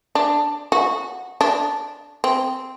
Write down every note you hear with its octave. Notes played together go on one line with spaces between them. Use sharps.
D4
F#4
D4
C4